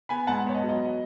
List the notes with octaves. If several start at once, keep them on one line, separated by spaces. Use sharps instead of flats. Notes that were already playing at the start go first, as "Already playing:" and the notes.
B3 G#5 B5
G#2 F#5 A5
B3 C#5
D#5
F#3
D#5